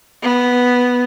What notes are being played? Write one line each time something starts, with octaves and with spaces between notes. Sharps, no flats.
B3